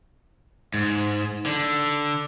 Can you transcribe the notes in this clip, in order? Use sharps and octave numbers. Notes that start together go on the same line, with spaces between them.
G#2
D3